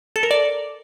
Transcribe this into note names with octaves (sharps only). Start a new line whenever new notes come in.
A4
A#4
D5